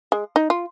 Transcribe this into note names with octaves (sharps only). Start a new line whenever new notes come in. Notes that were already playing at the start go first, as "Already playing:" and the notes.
G#3
D#4
F4